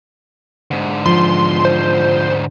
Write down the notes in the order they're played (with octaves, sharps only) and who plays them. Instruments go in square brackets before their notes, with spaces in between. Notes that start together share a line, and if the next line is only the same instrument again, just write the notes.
[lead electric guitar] G#2 D3
[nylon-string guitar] F3 [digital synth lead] C6
[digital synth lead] C5